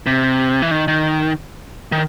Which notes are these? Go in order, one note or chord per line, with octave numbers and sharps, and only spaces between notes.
C3
E3
D#3
D#3
D#3